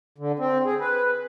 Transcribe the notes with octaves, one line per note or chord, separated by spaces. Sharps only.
D3
C4
G#4
B4